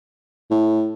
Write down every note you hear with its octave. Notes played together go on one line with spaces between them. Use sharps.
A2